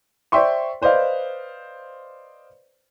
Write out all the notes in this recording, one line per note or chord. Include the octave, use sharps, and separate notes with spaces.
C5 D5 E5 G5 C6 C#6
B4 C5 D5 D#5 F5